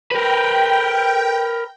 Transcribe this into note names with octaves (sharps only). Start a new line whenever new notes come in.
A#4 B4 G5